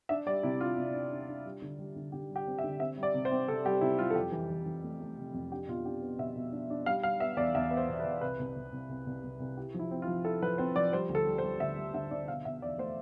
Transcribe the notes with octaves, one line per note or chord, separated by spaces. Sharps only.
D4 E5
G3 D5
C3 E4
D4 F4
C3
D4
D4
D4
G3
D3
G3
D3
D3 G4
G3
G4
C4
E5
D3
C4 E5
G3
D5
C3
C5
C4
C3 A4
G3 G4
C3 E4
G3 F4
A4
F2 G4
E3
E3
E3
A3
A3
C3
F2
D4 G4
B2 F4
D4 G4
B3
B2 E5
B2
D4
D4
G3 F5
G3 F5
B3 E5
E2 D5
E2 E5
B3
C5
B2
B4
E2
C2 B4
C2
C2
C2
C2
C2
C2
C2
E4 G4
F3
E4
C4
F4
F3
E4 A4
F3 B4
C4 C5
F3 D5
G3 C5
D2
A4
G3
C5
G3
D2 E5
G3
D3 E5
D3 D5
B2 F5
B2 E5
E2 D5
A3 C5